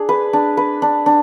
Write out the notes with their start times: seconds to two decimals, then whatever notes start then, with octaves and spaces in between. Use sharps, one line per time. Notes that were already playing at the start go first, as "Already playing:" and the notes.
Already playing: D4 G#4
0.09 B4
0.33 D4
0.57 B4
0.82 D4
1.06 D4